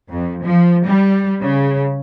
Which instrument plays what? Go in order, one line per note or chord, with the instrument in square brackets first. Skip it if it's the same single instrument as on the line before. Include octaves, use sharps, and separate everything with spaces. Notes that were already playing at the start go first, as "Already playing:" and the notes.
[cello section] F2
F3
G3
C#3